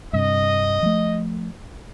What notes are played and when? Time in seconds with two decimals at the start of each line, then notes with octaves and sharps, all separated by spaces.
0.13 G2 C3 D#5
0.83 F3 A3